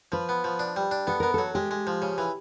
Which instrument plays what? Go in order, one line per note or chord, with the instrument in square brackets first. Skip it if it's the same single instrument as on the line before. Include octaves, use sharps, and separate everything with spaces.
[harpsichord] F3 [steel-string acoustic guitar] B4
[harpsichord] B3
F3
D4
G3
D4
[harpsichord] B3 [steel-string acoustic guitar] A4
[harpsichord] B3 [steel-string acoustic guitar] A#4
[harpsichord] F#3 [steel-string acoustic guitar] A4
[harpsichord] G#3 [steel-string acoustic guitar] G4
[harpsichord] G#3
F3
C#3
E3